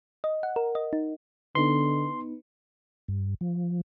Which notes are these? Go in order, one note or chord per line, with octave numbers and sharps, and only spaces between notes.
D#5
F#5
A#4
D#5
D#4
D3 B3 D#4 B4 C6
G2
F3